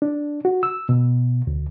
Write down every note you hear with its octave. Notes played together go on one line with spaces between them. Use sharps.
D4
F#4
E6
B2
D2